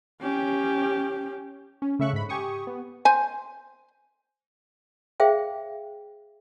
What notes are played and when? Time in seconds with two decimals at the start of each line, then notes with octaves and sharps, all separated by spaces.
0.22 C#4 G4
1.82 C#4
1.99 C#3 A3 E5 C#6 F#6
2.13 G#2 B5
2.29 G4 G#5 C#6 D#6
2.67 B3
3.05 C5 G#5
5.20 G#4 C5 E5 F5 G5